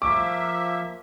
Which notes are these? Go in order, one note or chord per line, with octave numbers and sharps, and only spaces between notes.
F3 A#3 E5 D6